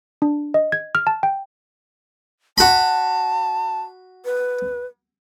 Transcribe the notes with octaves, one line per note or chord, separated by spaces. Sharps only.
D4
D#5
G#6
F6
A5
G5
F#4 A5 B5
B4